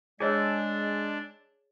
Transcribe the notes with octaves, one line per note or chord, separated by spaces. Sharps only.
G#3 D4 G#4 C#5 D5 G#5 A5 E6